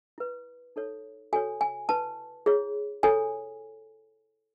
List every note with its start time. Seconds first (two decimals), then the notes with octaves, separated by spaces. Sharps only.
0.18 E4 B4
0.76 D#4 A4 C#5
1.33 F#4 A4 C#5 G#5
1.61 G#5
1.89 E4 B4 A5
2.46 E4 G#4 C#5
3.03 E4 A4 C#5 G#5